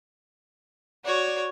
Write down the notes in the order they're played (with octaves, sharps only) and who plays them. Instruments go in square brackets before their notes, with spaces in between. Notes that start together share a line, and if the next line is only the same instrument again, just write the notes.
[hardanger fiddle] F#4 C#5 [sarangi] D5